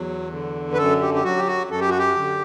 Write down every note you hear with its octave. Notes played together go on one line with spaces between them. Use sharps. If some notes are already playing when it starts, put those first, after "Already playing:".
Already playing: E2 F#3
D3
B4
F#2 A4
G4
G4
F#3 F#4
G4
F#4
F#2 A4
G4
F#4
G4
D3